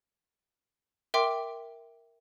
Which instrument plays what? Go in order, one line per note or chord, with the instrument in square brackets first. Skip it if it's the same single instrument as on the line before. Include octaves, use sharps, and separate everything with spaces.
[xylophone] A#4 E5 G5 C6 D6